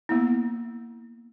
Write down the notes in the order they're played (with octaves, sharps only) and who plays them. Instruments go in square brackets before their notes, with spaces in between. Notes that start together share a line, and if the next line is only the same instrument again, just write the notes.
[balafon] A#3 B3 E4